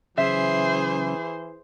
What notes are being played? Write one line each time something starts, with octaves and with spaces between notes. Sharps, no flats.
C#3 E3 F#3 C#4 G#4 C5 E5